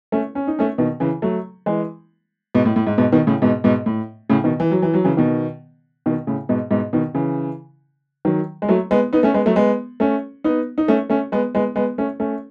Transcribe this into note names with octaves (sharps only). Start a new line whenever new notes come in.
A3 C#4
C#4
D#4
A3 C#4
B2 D#3
C#3 E3
F#3 A3
E3 G#3
G#2 B2
A2
A2
G#2
G#2 B2
B2 D#3
A2 C#3
G#2 B2
G#2 B2
A2
A2 C#3
B2 D#3
E3
F#3
E3
F#3
C#3 E3
B2 D#3
B2 D#3
A2 C#3
G#2 B2
G#2 B2
B2 D#3
C#3 E3
D#3 F#3
G#3
F#3 A3
G#3 B3
B3 D#4
A3 C#4
G#3 B3
F#3 A3
G#3 B3
A3 C#4
B3 D#4
D#4
A3 C#4
A3 C#4
G#3 B3
G#3 B3
G#3 B3
A3 C#4
A3 C#4